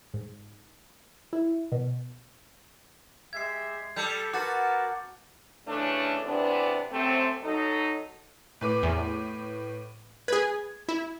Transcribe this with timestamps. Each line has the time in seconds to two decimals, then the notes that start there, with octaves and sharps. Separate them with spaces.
0.14 G#2
1.33 E4
1.72 B2
3.33 G#3 G4 E5 G#6 C7
3.96 G3 A4 G6 C#7
4.33 F#4 A#4 B4 A5 D6 A6
5.68 C#3 E3 A3 C#4 D4
6.25 E2 C3 E3 B3 D4
6.91 F#2 C3 A3 C4
7.43 F#3 D#4 A4
8.61 A2 B4 D6
8.83 E2
10.28 G#4 B4 G#6
10.89 E4